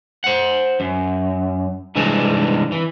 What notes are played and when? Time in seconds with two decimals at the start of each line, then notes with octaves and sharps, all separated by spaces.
0.24 C5 F#5
0.80 F#2
1.95 G2 C3 E3 G#3 D4 D#4
2.72 E3